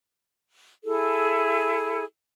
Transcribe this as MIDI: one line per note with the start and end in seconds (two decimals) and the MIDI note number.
0.84 2.03 64
0.84 2.03 68
0.84 2.03 69